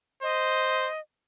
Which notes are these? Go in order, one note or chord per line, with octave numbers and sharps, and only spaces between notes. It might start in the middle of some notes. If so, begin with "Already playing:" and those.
C5 D#5